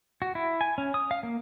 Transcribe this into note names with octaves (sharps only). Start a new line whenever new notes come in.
F#4
E4
G#5
C#4
D#6
F5
A#3